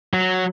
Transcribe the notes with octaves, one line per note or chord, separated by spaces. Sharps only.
F#3